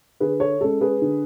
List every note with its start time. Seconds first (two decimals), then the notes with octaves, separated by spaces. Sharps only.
0.20 D3 G#4 B4
0.40 A4 C#5
0.61 G#3 C#4 A4
0.81 G#4 B4
1.02 D3